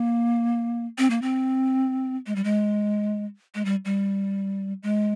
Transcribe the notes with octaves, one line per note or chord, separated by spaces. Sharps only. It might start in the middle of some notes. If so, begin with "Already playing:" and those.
Already playing: A#3
C4
A#3
C4
G#3
G3
G#3
G#3
G3
G3
G#3